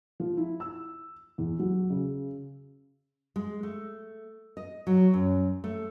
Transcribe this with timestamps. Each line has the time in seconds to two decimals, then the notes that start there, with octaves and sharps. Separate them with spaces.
0.20 F3
0.37 E4
0.60 E6
1.38 E2
1.59 F#3
1.90 C#3
3.36 G#3
3.63 A3
4.57 D#5
4.87 F#3
5.14 F#2
5.64 A3